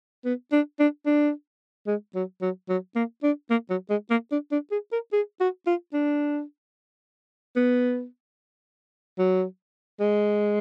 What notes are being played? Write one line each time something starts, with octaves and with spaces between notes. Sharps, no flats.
B3
D4
D4
D4
G#3
F#3
F#3
F#3
A#3
D4
A#3
F#3
G#3
A#3
D4
D4
G#4
A#4
G#4
F#4
F4
D4
B3
F#3
G#3